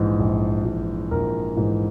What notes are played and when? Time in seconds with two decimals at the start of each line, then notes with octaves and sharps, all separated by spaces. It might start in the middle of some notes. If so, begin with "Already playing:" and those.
Already playing: A#1 G#2 E3
0.19 A#1
0.65 G#2 E3
1.11 A#1 A#4
1.57 G#2 E3